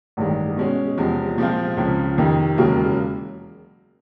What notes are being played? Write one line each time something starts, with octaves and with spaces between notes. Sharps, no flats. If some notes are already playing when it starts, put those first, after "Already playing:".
A1 G2 D#3 G#3
B2 G#3 C#4
E2 C3 F3 G#3
A#2 F3 G#3 C4 F4
C#2 C#3 F3
F2 C3 D#3
E1 D#2 C#3 F#3 A#3